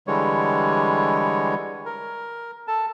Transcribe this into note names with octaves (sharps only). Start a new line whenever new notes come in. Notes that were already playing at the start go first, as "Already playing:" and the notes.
D3 E3 G3 G#3 C#5
A#4
A4 A5